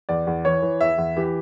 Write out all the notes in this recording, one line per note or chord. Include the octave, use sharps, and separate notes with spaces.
E2 D5
E2
E3 C#5
E3
E2 E5
E2
E3 G4